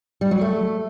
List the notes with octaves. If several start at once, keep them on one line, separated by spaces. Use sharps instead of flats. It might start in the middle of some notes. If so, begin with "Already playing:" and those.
G3
F#3
A3